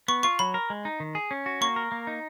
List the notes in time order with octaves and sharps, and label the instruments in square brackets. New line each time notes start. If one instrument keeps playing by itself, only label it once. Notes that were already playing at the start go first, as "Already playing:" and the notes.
[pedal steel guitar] B3 [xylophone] C#6
[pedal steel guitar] F4 [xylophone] C#6
[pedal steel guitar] F#3 [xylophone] B5
[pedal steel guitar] A#4
G#3
D#4
D#3
G#4
C#4
F#4
[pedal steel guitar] A#3 [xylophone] C#6
[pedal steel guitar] A#4
A#3
D#4